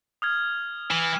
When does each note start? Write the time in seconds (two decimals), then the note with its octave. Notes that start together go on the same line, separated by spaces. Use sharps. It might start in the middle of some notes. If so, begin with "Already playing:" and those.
0.22 D#6 F6 G#6
0.91 E3 E7